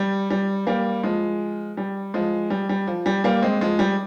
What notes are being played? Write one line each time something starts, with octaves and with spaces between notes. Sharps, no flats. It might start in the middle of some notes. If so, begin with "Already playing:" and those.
Already playing: G3
G3
G3 A#3
F3 G#3
G3
F3 G#3
G3
G3
F3
G3
G3 A#3
G#3 C4
F3 G#3
G3